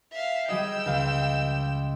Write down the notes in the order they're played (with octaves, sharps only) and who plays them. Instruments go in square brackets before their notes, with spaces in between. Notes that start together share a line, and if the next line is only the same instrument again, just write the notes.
[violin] E5 F5
[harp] G3 G#4 D#5 [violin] G5 E6
[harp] C#2 F5